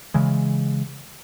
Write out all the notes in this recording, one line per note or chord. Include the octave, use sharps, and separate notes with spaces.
C#3 E3 G#3